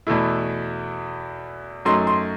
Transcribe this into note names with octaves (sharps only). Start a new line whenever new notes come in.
E2 B2 A3 E4
F#2 F#3 A3 D#4 C6
C6